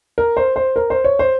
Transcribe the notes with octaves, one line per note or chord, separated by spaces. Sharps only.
A#4
C5
C5
A#4
C5
C#5
C5